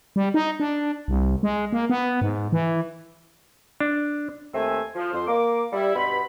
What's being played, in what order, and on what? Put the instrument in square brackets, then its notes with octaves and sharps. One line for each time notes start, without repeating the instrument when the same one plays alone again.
[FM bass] G3
D#4
D4
C2
G#3
A#3
B3
G#2
E3
[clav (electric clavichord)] D4
[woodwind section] D#2 A3 C4 E5 G#5
F3
F2 C5
A#3 D6
G3 E4
G2 B2 B3 C5 B5